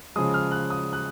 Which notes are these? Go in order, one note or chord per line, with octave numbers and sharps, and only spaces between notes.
C#3 F3 G#3 D#6
F6
F#6
D#6
F#6